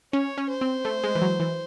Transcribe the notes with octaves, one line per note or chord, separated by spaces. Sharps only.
C#4 C#5
C#4
C5
C4
A3
G#3
E3
F#3
E3